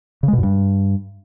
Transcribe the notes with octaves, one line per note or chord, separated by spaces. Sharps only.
C#3
G#3
B2
F#2
G2